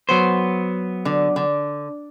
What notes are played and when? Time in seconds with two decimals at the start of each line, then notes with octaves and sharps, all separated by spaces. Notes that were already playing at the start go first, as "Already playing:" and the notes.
0.09 F#3 B3 C5
1.05 D3
1.36 D3